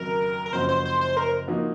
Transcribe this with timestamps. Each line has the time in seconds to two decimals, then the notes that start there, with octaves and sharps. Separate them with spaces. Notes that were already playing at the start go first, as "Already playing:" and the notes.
Already playing: F1 D#2 C#3 F#3 A#4
0.46 A#4
0.53 F#1 F#2 F3 C4 F#4 C5
0.69 C5
0.85 C5
1.01 C5
1.17 A#4
1.47 F3 A#3 D#4 F#4